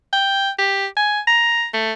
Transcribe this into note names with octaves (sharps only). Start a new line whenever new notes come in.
G5
G4
G#5
A#5
A3